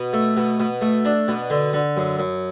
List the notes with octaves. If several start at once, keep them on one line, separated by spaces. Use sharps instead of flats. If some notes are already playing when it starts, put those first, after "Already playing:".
Already playing: B2
A3
B2
B2
A3
D4
B2
D3
D3
F#2
F#2